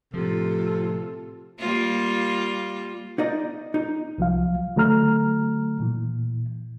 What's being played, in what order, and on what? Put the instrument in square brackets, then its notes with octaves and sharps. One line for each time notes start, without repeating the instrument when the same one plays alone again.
[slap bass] A2 F3 [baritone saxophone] C3 [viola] F4 A4
[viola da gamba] G3 A#3 F4
[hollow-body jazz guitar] D#4 C5 D5 D#5
D#4
[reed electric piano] C2 F3 F#3 F5
D3 F#3 A3 A#5 F6
A#2 E3